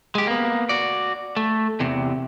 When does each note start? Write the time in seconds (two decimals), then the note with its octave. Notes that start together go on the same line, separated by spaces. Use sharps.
0.15 G#3 G4
0.27 A#3 B3
0.69 F#4 D5
1.37 A3
1.80 E2 C3